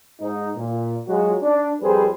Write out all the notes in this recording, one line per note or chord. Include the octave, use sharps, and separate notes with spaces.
G#2 D#4
A#2
F#3 G#3 F4 F#4
D4
F2 G3 G#4 A4 B4 C5